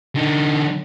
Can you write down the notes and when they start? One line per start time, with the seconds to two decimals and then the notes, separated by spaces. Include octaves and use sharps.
0.15 D3 D#4